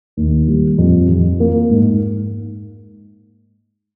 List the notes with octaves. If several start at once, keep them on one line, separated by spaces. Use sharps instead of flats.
D#2
G3
F2
F2
A#3
G#2